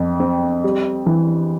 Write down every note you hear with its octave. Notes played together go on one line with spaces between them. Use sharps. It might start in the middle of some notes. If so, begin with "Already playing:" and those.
Already playing: F2
C4
G3
E3